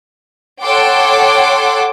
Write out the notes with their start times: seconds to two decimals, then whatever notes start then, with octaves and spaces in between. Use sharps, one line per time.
0.62 A4 C#5 F#5 G5 C6 D6